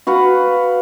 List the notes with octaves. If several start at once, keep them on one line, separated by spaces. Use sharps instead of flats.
F#4 B4 F5 F#5